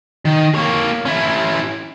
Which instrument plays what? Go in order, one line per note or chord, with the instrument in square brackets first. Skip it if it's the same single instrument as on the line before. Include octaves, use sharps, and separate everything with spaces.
[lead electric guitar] D#3
A#3 C#5
C#4 E4